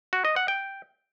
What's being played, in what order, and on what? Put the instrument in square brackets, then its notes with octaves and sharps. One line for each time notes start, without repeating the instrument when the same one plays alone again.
[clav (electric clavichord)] F#4
D#5
F#5
G5